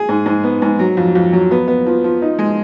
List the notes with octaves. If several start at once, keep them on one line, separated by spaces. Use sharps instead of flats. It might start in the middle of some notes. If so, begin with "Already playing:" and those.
Already playing: G#4
G#2
G#2
B3
G#2
F#3
F2
F2
F#3
B3
B3
F3
F3
D#4
G#3